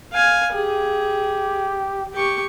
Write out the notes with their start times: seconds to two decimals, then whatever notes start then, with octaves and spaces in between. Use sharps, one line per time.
0.13 F5 G#5
0.53 G4 G#4
2.14 G4 C#6